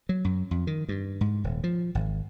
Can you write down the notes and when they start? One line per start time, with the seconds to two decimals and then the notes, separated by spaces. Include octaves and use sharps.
0.09 F#3
0.25 F#2
0.51 F2
0.67 D#3
0.89 G2
1.21 G#2
1.44 D#1
1.64 F3
1.95 G#1